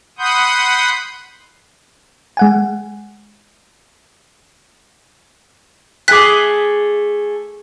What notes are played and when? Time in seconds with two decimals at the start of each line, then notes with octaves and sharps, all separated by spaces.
0.18 F#5 B5 C6 D#6 G6
2.37 G#3 F#5 G#5
6.08 A3 G#4 G#5 D6 F#6 B6